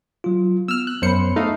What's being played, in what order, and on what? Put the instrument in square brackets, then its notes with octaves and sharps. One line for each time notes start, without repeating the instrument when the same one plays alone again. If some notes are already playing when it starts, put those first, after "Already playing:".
[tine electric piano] F#3 F4
[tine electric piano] B3 [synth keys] E6 F6
[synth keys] F#6
[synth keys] F#2 C5 C#7 [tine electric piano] B3 C#5 B5
[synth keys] A3 D#4 F5